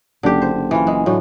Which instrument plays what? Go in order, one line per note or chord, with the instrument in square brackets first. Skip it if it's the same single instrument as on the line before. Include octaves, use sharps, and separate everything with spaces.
[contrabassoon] F#1 [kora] D3 G4
[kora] C5
[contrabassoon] F#1
[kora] E3 F4
G#3
[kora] A2 D3 [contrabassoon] F#3